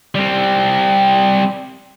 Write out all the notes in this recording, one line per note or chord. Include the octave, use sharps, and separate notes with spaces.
G3 C4